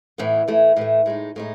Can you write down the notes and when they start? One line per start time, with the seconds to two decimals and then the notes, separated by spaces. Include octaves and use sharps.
0.18 A2 E3 B3
0.48 A2 E3 A3
0.77 A2 E3 A3
1.06 A2 G#3 D#4
1.36 A2 G#3 D#4